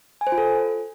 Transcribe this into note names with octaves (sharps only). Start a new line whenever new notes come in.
G#5
C5
F4
A4